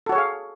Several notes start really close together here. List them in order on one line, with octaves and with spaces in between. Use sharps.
A4 F#4 C#5 G#4 F5